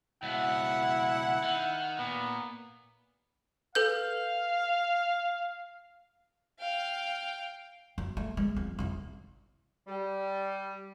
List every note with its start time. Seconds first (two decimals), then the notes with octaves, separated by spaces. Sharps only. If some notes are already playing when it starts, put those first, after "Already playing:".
0.23 C#2 B2 E4 F#5
1.44 D#3
1.98 A#2 B3
3.75 A4 B4 F5 G6
6.60 F5 G5
7.98 F#2
8.17 A3
8.37 G#3
8.56 F2
8.79 F1 E3
9.87 G3